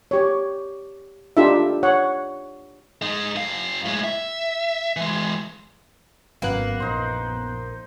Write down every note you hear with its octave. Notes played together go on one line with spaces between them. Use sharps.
G4 C#5
D4 D#4 F4 G4 A4 E5
C#5 F#5
G#3 D#4
F#2 F5
A2 G#3
E5
E3 G#3
G#1 F#2 A#3 B3 F#6
A#1 D#4 C5